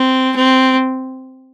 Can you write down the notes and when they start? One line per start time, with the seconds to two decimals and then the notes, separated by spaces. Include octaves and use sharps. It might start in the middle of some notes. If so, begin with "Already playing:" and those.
Already playing: C4
0.36 C4